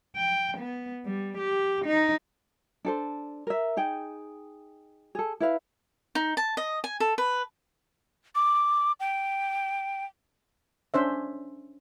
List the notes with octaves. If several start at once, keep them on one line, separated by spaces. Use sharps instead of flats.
G5
B3
G3
G4
D#4
D4 A4 C5
A#4 E5
D#4 G#4 G5
G#4 A4
E4 B4 F5
D#4
A5
D#5
G#5
A4
B4
D6
G5
C#4 D4 C5 E5